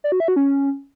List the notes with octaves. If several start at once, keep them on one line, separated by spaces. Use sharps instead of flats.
D5
F#4
E5
F#4
C#4